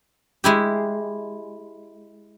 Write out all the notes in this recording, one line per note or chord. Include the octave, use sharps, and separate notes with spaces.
G#3 E4 G4